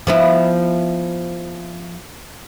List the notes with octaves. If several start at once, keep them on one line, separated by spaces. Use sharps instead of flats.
F3 B3 E4